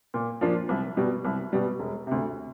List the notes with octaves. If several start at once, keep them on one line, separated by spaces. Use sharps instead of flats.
A#2
F3 A#3 D4 F4
C2
B2 G3
C2
B2 G3
E1
D2 C3